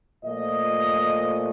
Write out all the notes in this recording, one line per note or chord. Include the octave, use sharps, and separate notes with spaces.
A#2 F3 A3 D#5